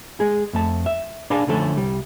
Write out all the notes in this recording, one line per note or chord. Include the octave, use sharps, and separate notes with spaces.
G#3 G#4
F2 A3 A5
E5
D4 G#4 D5 F5 G#5 A5
D3 F3 A3 C#4 A4
C2 G3